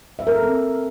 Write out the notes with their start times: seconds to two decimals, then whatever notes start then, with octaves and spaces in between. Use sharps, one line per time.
0.19 E5
0.27 A#4
0.35 A4
0.43 C4